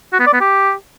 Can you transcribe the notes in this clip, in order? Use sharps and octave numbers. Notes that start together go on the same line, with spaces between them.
F#4
B3
D5
B3
G4